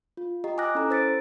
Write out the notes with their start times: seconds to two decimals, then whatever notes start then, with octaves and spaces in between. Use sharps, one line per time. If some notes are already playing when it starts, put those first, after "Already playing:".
0.17 F4
0.44 G4 D#5 A#5
0.58 G#5 D6 D#6 F6 F#6 A#6
0.75 C#4 E4 A4 D5 A#5
0.90 C5 E6 A6 B6 C#7 D7